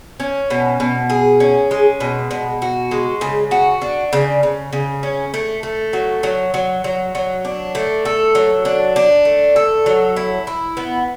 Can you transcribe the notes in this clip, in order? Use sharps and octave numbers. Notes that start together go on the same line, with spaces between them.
C#4
B2
B2
G#4
C#4
G#3
B2
B2
F#4
G#3
C#3
F#4
D4
C#3
C#3
C#3
C#4
A3
A3
F#3
F#3
F#3
F#3
F#3
D4
A3
A4
F#3
D4
D4
A3
A4
F#3
E4
E4
B3